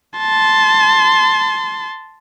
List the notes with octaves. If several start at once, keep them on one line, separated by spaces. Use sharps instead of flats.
A5 C6